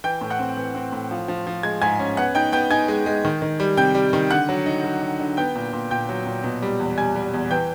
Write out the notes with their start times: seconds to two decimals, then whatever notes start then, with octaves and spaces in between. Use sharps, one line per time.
0.04 E3 G5 G6
0.21 A2
0.30 F#5 F#6
0.39 C4
0.57 E3
0.75 C4
0.92 A2
1.11 F3
1.28 F3
1.47 F3
1.63 G#3 G#6
1.82 G#2 G#5 G#6
1.99 C#4
2.17 B3 F#5 F#6
2.35 D#4 G5 G6
2.52 B3 G5 G6
2.71 D#4 G#5 G#6
2.88 G#3
3.06 G#3
3.25 D#3
3.42 D#3
3.60 G3
3.77 C3 G5 G6
3.95 G3
4.13 D#3
4.31 D3 F#5 F#6
4.49 F#3
4.66 D#4
4.84 F#3
5.02 D3
5.20 D3
5.37 B3 G5 G6
5.55 A#2
5.73 A#2
5.91 A#2 G5 G6
6.09 F#3
6.26 A#2
6.44 B2
6.62 G3
6.80 E2
6.97 G3 G#5 G#6
7.15 G3
7.34 E2
7.51 E3 G5 G6